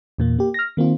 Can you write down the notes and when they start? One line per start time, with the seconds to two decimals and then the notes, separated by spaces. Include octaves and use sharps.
0.18 E2 A#2 A#3
0.39 A#3 G4
0.54 F6 A#6
0.77 D#3 A#3 C4 F4